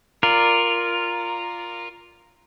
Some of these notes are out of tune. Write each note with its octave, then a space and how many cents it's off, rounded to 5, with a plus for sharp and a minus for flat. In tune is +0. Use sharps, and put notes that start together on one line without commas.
F4 +0 A#4 +0 D5 +0